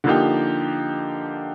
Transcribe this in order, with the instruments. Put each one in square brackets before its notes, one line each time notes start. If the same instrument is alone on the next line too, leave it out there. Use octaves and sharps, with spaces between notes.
[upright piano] D3 F3 A#3 D#4 G4